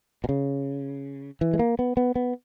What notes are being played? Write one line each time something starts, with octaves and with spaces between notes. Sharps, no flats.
B2
C#3
E3
G#3
A#3
B3
B3
B3